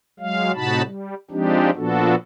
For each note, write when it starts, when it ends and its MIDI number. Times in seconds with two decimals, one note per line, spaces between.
0.20 0.52 54
0.20 0.52 56
0.20 0.52 77
0.54 0.82 45
0.54 0.82 48
0.54 0.82 63
0.54 0.82 66
0.54 0.82 81
0.54 0.82 83
0.84 1.14 55
1.31 1.70 53
1.31 1.70 56
1.31 1.70 60
1.31 1.70 62
1.31 1.70 63
1.31 1.70 67
1.76 2.15 46
1.76 2.15 53
1.76 2.15 59
1.76 2.15 62
1.76 2.15 66
1.76 2.15 69